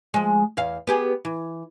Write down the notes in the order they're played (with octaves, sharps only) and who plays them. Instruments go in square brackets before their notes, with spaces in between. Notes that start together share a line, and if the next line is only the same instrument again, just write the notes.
[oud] F3 G#3
E2 F5
B3 G4 G#4
E3